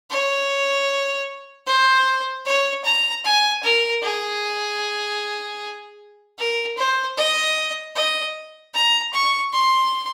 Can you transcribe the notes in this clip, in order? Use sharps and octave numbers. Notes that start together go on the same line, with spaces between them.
C#5
C5
C#5
A#5
G#5
A#4
G#4
A#4
C5
D#5
D#5
A#5
C#6
C6